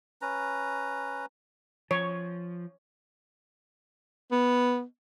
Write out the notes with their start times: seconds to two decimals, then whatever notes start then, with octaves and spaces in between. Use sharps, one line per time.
0.22 C#4 B4 A#5
1.91 F3 C#5
4.31 B3